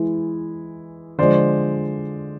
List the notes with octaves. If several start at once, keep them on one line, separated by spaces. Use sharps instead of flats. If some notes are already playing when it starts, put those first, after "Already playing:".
Already playing: E3 G#3 E4
D3 F3 G#3 C5 D5